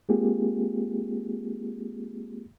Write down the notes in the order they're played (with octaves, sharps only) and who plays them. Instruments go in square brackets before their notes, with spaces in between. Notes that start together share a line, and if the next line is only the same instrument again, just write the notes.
[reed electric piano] G#3 A#3 C4 F4 G4 G#4